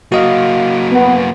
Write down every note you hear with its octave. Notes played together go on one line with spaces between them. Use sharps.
F#3 A#3 F#4 D#5 F5
B3